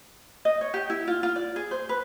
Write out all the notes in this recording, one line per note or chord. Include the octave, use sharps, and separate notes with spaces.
D#5
C#5
G4
E4
F4
F4
D5
G#4
C5
B4